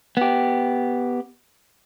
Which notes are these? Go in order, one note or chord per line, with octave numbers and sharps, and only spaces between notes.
B3 G4